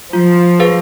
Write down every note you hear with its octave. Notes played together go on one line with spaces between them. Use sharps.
F3 F4
G#4 B4 F5